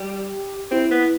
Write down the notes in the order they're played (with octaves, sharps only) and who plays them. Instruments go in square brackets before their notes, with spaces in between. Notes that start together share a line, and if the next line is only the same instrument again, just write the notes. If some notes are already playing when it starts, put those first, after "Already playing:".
Already playing: [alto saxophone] G3 [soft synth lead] G4
[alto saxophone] C4 [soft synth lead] E4
[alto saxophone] B3